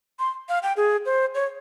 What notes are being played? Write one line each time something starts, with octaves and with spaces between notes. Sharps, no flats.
C6
F5
G5
G#4
C5
C#5